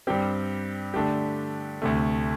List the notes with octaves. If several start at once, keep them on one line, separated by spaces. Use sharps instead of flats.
G2 G3 C4 G4
D3 A3 D4 G4
D2 C3 A3